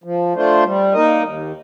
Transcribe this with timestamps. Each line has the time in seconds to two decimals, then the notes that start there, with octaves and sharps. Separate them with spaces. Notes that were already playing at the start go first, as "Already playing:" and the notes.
0.04 F3
0.34 A3 D4 F4 C5
0.64 G3
0.93 A#3 D#4 A#4 D#5
1.23 D#2